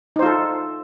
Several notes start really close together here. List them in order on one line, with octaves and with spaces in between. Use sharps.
D#4 C5 F4 A4